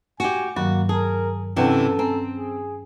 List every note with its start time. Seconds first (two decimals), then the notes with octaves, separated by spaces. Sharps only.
0.20 F#4 G4 G#5
0.56 G2 D#3 F#3 A#3 F#4
0.89 G#4 A#4 A5
1.56 C3 E3 C#4 D4 A4 F#5 G5
1.99 C4 G#5 A#5
2.35 G#4